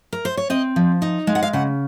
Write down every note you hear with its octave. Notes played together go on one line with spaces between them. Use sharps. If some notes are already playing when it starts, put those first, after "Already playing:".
A#4
C5
C#5
C4 D#5
F3
D#4
G#3 F5
F#5
F5
C#3 F#5